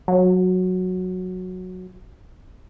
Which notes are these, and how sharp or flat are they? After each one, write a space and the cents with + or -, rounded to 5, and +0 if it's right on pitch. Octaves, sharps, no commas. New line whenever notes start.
F#3 -10